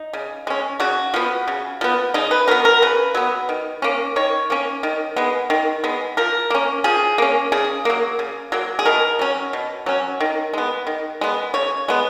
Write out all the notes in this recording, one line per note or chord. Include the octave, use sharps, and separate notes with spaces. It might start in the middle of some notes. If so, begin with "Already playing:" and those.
Already playing: D#4
C#3
G#3 C#4
C#3 F#4
F3 B3
C#3
F3 B3
C#3 D#4
B4
F#3 B3 A#4
A#4
C#3 B4
F#3 B3
D#3
A#3 C#4
D#3 C#5
A#3 C#4
D#3
G#3 B3
D#3
G#3 B3
F3 A#4
A#3 C#4
F3 G#4
A#3 C#4
C#3 G#4
F#3 A#3
C#3
F#3 A#3
G#4
B2 A#4
F#3 C#4
B2
F#3 C#4
D#3
G#3 B3
D#3
G#3 B3
C#3 C#5
G#3 B3